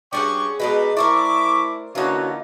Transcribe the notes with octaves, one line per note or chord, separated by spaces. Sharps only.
G2 C#4 F#4 G#4 D5 F#5 G5 C#6
B2 G#3 D4 D#4 B4
A3 E4 A#4 C5 D5 E5 C#6 D6
D3 E3 A#3 C#4 D#4 F4 F#4 C#5